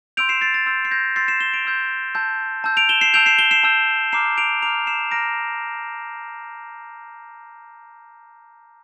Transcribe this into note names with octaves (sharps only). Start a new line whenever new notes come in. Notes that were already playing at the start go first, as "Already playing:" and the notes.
C6 E6 G6 D7 F7
C7 E7
A6 C7
A6
C6 E6 G6
C7
G6 A#6
C6 E6 G6 A6 C7
C7 E7
E7 G7
D7 F7
C6 E6 G6
A5 E6 G6
A5 E6 G6
D7 F7
E7 G7
C7 E7
A5 E6 G6 D7 F7
C7 E7
E7 G7
C7 E7
A5 E6 G6
A#5 D6 F6 C7 E7
D7 F7
A#5 D6 F6 D7 F7
C7 E7
A#5 D6 F6 A#6 D7